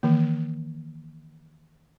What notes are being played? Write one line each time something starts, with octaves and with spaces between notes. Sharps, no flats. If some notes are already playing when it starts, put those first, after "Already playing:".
D#3 E3 A#3